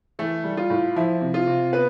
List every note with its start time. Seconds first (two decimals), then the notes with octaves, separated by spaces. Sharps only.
0.19 E3 A3 A4
0.44 G3
0.57 F4
0.70 A2
0.96 F3 E4
1.21 C3
1.34 F4
1.47 C3
1.73 B3 B4